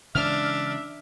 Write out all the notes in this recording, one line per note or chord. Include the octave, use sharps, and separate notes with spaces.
C#3 E3 G#3 D4 E5 F6